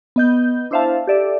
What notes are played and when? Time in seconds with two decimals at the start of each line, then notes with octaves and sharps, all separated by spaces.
0.16 B3 D#5 G6
0.71 D4 E4 C5 E5 F5 A5
1.07 G4 A4 D5 E5